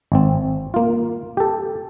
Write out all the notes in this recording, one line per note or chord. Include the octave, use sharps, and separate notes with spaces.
G#1 C4
A#3 F4
G4 A4